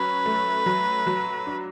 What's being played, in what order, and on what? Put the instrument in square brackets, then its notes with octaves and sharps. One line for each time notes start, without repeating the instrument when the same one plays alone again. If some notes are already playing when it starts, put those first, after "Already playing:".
Already playing: [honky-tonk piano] F#3 C#4 [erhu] B4
[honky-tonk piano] A3
F#3
F#3
D4